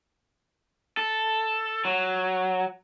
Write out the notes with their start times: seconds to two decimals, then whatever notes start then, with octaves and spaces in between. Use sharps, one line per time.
0.97 A4
1.85 F#3